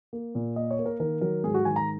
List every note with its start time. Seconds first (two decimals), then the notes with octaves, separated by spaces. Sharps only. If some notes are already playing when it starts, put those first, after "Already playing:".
0.13 A#3
0.35 A#2
0.56 A#3 D#5
0.71 C#5
0.79 A#3
0.86 A#4
1.00 D#3 A#4
1.21 F#3 A#4
1.44 G#2 G#4
1.54 F#4
1.65 D#3 G#5
1.76 A#5